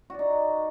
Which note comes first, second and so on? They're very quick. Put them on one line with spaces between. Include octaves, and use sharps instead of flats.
F#4 D5 D#4